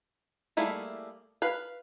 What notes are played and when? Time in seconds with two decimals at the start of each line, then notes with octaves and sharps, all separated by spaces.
0.57 G3 A3 A#3 E4 G#4
1.42 B4 F5